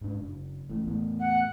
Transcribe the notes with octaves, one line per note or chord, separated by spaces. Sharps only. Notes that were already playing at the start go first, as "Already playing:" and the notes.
G#2 D4
F#1
A1 A2
E2 A2
F#5